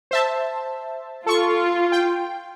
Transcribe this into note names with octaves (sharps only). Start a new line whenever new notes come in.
C5 E5 A5
F4 A4 C#6
G5